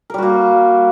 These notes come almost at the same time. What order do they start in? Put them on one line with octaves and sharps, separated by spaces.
A#4 G3 F#4 A#3